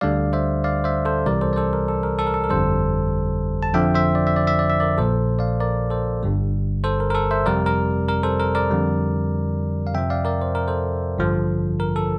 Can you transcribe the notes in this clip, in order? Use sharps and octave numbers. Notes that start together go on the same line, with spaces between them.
D2 D3 G3 D5 F5
C5 E5
D5 F5
C5 E5
A4 C5
C2 C3 E3 G3 A#4 D5
A4 C5
D5
A4 C5
A#4
A4
A#4
A4
A#4
A4
A#4
G1 F2 D3 G3 A4 C5
A5
F2 D3 F3 E5 G5
C5 E5
D5
E5
D5
E5
D5
E5
A#4 D5
A#1 A#2 F3 A4 C5
D5 F5
A#4 D5
A4 C5
G1 G2 D3 G3
A4 C5
A#4
A#4
A4
C5 E5
F2 C3 G3 A#4 D5
A#4
A#4
A4 C5
A#4
A#4 D5
F2 D3 G3
F5
F2 C3 F3 E5 G5
D5 F5
A#4 D5
C5
A#4
A4 C5
A1 G2 D3 F3
A#4
A4